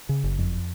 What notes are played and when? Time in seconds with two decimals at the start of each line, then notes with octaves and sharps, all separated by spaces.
0.09 C#3
0.24 F#1
0.39 F2